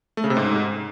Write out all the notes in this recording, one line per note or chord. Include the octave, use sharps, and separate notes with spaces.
A3
C#3
C3
G#2